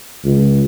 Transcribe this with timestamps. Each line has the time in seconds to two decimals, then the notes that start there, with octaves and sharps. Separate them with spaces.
0.25 C#2